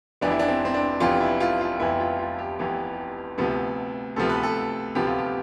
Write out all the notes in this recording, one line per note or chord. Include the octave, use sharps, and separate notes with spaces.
F1 F2 E3 B3 D4
E4
D4
C4
C4
D4
F1 F2 E3 B3 F4
E4
F4
F4
F1 F2 E3 B3 E4
F4
F4
G4
F1 F2 E3 B3
D2 C3 F3 B3
D2 C3 F3 B3 A4
B4
A4
D2 C3 F3 B3 G4
F4
G4